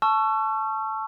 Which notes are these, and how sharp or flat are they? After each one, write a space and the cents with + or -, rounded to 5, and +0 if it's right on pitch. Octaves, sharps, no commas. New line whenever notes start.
A5 -10 C#6 +0 E6 +40